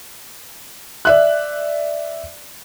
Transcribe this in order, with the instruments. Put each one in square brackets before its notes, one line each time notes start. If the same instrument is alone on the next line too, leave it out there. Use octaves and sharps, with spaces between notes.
[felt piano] D5 E5 F#6